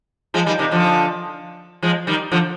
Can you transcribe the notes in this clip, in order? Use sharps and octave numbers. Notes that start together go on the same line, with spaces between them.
F3 G#3
D#3 G3
C3 D#3
D3 F3
F3 G#3
D#3 G3
D3 F3